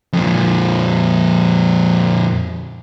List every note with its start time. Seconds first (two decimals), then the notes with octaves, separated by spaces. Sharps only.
0.13 F2 A#2